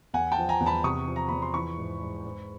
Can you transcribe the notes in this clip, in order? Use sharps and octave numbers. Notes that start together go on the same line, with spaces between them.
E2 F#5 G#5
G5 A5
F3
G#5 A#5
E2
A5 B5
C3 C#6 D#6
F3
A#5
E2 B5
C6
E3 B5 C#6
G#2
G#2
G#2